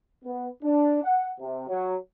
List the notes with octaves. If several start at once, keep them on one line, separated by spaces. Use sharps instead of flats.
B3
D4
F#5
C3
F#3